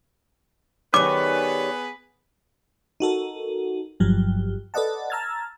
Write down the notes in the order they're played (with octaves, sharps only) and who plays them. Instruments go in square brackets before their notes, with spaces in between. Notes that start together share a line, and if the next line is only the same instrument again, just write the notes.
[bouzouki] D#3 G3 C#4 [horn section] B3 G#4 B4 [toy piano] D6
[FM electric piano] D#4 F#4 A4 A#4
G1 G2 F3 F#3 G4
A4 B4 D5 D#5 F#5 A5
A5 A#5 E6 F6 G#6 A6